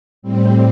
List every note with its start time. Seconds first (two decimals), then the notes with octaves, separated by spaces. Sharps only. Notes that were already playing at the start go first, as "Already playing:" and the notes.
0.22 A2 G3 C4